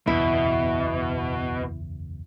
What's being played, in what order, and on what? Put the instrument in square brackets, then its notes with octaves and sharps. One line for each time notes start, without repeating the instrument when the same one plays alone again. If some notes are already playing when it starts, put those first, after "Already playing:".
[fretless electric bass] F#1 B1 E2 [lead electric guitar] B2 [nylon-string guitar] E4